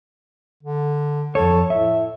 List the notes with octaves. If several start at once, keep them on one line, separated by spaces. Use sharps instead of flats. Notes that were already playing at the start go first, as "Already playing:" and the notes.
D3
F2 A4 C#5
A2 E5